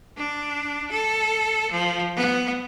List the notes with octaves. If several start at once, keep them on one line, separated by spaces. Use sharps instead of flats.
D4
A4
F3
B3